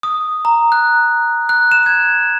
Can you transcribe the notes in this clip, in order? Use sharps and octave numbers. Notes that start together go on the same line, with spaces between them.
D#6
A#5
F#6
F#6
E7
G#6